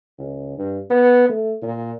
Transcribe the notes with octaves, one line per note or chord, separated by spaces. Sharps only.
C#2
G2
B3
A3
A#2